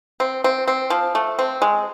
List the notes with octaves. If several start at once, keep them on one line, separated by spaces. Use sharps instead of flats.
C4
C4
C4
F3
A3
C4
G#3